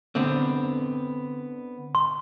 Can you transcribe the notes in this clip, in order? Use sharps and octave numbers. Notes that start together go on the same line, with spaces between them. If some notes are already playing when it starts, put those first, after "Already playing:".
D3 B3 C4
C6